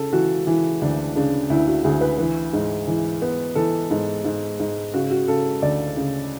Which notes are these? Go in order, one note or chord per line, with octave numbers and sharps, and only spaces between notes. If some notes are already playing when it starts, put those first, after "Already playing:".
Already playing: C#3 A4
E3 F#4
E3 E4
D2 D4
C#3 D4
D2 E4
F#4
D2 G#4
B4
E3 B4
G#2
E3
B3
E3 A4
G#2
G#2
G#2
C#3 F#4
F#4
C#3 A4
D2 D5
C#3